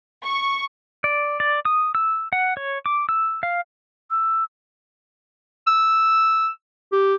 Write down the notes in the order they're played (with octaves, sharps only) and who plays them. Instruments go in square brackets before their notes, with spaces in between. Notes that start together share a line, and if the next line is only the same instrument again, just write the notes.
[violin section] C#6
[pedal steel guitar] D5
D5
D#6
E6
F#5
C#5
D6
E6
F5
[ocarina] E6
[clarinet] E6
G4